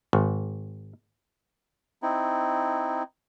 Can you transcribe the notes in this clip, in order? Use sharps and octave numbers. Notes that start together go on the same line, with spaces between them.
G#1
C4 D#4 E4